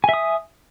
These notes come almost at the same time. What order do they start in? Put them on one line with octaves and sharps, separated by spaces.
G#5 E5 D#6